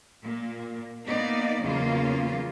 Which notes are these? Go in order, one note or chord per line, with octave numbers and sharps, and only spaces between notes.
A#2 A#3
A#3 B3 D#4 D5
E2 C#3 F#3 A#3 F4